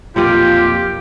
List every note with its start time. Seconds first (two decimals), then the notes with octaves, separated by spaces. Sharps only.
0.16 B1 F2 A#2 F4 G4